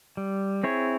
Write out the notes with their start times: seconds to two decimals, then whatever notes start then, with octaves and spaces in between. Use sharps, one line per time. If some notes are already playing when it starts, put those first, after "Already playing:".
0.17 G3
0.63 C4 E4 G#4 C#5